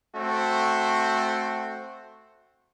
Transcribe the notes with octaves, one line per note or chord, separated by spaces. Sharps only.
A3 C4 F#4